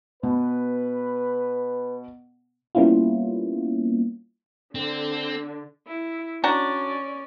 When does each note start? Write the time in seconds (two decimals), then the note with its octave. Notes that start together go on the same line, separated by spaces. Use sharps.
0.23 B2 B4
2.75 G3 A#3 B3 C#4 E4 F4
4.75 D3 C4
5.87 E4
6.44 C#4 D4 F#4 D5 A#5